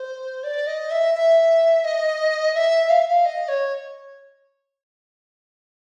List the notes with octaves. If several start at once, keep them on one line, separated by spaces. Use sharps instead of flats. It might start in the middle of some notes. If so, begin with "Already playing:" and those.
Already playing: C5
D5
D#5
E5
E5
D#5
E5
F5
E5
F5
D#5
C#5